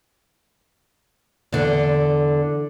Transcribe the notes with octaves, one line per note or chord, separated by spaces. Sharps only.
E2 D3